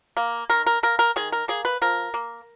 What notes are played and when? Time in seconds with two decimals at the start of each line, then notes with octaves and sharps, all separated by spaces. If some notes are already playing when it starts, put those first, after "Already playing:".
0.17 A#3
0.50 D#3 A#4
0.66 A#4
0.83 A#3 A#4
0.99 A#4
1.16 D#3 G#4
1.32 A#4
1.48 A#3 G#4
1.65 B4
1.82 F3 A#4
2.14 A#3